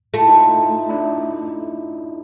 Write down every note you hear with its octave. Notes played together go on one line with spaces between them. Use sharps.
A3 F4
E4
D#4 F4
D4 E4